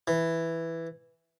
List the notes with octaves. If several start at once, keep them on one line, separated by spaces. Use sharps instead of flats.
E3